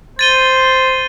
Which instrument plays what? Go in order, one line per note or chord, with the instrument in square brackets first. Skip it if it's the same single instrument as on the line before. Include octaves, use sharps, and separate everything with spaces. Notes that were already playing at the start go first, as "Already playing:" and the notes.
[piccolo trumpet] C5 [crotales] A6 D#7 G7